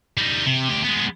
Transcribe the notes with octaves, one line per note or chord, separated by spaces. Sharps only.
G3 D#4
C3
D2 G4
G#3 B3